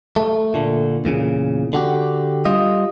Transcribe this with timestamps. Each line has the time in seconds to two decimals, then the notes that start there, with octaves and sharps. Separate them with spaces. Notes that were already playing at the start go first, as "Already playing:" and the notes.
0.16 A3
0.54 A#2 D3
1.05 E2 A#2 C#3
1.73 D3 F#4 G4
2.45 G3 F4 D#5